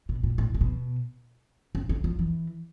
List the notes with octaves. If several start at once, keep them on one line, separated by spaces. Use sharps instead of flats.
B2
A#2
A2
A#2
B2
C#3
D3
F3
E3